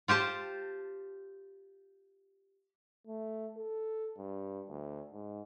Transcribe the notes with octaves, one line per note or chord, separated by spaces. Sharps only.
F4 G4 C5 A5
A3
A4
G2
D2
G#2